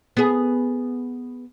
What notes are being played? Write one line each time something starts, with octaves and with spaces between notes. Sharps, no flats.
B3 G#4